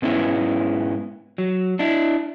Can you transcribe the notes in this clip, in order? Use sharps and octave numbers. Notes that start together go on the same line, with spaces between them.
G#2 B3 C#4 E4
F#3
D4 E4